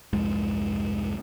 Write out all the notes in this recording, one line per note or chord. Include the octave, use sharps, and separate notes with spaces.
C2 F2 G#2 G#3